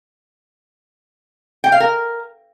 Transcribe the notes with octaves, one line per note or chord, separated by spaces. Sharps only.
G5
F5
A#4